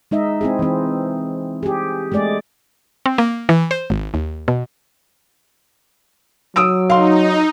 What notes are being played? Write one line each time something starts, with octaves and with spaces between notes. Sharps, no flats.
G#3 D#4 D#5 E5
C4 E4 G#4
E3 C4
G4 G#4
G#3 A3 G#4 D5
C4
A#3
E3
C5
G#1
D#2
B2
F#3 D#6 E6 D7
D#4 F5 C6